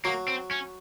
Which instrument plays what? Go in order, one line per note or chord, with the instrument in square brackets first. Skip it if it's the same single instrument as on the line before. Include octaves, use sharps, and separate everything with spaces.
[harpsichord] F#3 [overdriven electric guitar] A#3
[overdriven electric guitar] C4
C#4